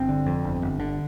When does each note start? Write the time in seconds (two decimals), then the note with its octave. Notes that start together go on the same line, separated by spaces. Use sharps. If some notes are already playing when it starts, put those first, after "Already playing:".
Already playing: G1 C4
0.09 D3
0.26 F2
0.44 G1
0.62 G1
0.80 D3